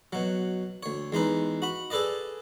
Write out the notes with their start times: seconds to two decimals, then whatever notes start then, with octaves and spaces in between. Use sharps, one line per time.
0.13 B2 F#3
0.83 D2 C#5
1.12 E2 G#3 D#4 B4
1.62 F#4 B5
1.90 G#4 A4 B4 D5 D#5